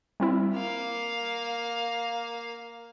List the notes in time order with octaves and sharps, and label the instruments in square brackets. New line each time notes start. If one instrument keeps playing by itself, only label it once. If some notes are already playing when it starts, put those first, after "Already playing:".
[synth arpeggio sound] G3 C4 E4
[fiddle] A#3 F5